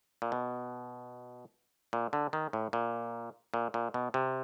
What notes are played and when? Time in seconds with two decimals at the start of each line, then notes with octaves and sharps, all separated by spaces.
0.22 A#2
0.32 B2
1.93 A#2
2.13 D3
2.33 D#3
2.53 A2
2.73 A#2
3.54 A#2
3.74 A#2
3.94 B2
4.14 C3